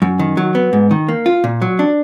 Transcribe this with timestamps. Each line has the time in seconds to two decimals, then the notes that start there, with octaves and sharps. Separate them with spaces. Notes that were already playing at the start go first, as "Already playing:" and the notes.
0.02 F#2
0.19 D#3
0.37 F#3
0.55 B3
0.73 G#2
0.91 D#3
1.08 A#3
1.26 F4
1.44 A#2
1.62 F#3
1.79 D4